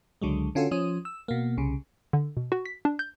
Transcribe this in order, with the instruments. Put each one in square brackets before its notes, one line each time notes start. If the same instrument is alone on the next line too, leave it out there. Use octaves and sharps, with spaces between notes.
[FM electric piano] C#2 D3 F#3 G#3
D3 C#4 F4 F#4 A4
F3 C#4 D#6
E6
B2 A#3
C2 C#3
[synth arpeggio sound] D3
B2
F#4
B6
D4
G6